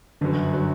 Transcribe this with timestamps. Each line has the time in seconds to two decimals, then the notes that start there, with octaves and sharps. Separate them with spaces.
0.21 G1 F#2 D3 F#3
0.54 F#3